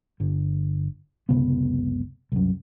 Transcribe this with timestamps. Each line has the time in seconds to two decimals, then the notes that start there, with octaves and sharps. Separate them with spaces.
0.20 G1 D3
1.29 F#1 C#2 C3 B3
2.32 C2 F#2